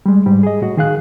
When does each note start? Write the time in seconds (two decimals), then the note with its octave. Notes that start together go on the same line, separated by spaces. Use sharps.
0.06 G3 G#3
0.26 G#2 G3
0.43 G#4 D#5
0.62 A2 F#4
0.77 D#3 G#4 F5 F#6